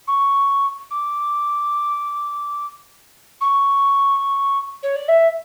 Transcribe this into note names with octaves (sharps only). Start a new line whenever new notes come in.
C#6
D6
C#6
C#5
D5
E5